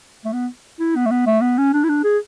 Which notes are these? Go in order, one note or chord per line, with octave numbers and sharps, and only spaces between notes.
A3
B3
E4
B3
A3
B3
A3
B3
C#4
D4
E4
D4
G#4